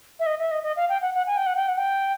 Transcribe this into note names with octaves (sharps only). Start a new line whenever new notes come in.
E5
D#5
E5
D#5
D#5
F5
G5
F#5
F#5
G#5
G5
F#5
G5
F#5
G5